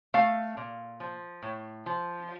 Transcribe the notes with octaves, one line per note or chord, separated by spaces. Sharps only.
A3 F5
A#2
F3
A2
F3